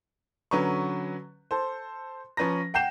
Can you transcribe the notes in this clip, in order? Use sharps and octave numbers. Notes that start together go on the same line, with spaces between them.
D3 F#3 C#4 B4 A#5 C#6
A4 C5
F3 C#4 B4 A#5 A#6
F#5 G5 G6 C7 E7